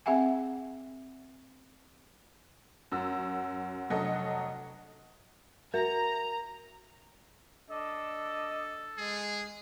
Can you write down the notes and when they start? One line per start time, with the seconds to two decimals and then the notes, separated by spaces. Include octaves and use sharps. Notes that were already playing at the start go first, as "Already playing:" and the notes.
0.06 C4 G#4 E5 F#5 G#5
2.92 F#2 F#4 E6
3.90 F1 F#3 D4 F#4 A4 D#5
5.74 F#4 A#4 A#5
7.70 D4 A4 D#5
8.98 G#3 G#4